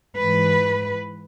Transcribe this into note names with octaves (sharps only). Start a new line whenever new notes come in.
G#2 E3 B4